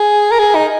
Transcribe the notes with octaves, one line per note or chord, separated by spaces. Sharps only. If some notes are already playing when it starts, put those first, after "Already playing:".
Already playing: G#4
A#4
G#4
D#4